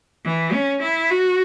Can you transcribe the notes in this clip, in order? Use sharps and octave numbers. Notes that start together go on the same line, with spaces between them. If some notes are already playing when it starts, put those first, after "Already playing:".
E3
C#4
E4
F#4